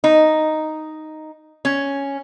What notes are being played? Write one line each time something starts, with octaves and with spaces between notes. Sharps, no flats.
D#4
C#4